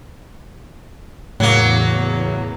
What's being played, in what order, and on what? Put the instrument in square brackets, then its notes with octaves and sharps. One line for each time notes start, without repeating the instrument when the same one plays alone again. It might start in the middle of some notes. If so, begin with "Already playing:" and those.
[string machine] E2 [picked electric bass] A2 [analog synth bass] C#3 [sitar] F#3 A#3